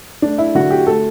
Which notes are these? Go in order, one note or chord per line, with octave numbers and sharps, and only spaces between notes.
A3 D4
E4
D3 F#4
G4
A3 A4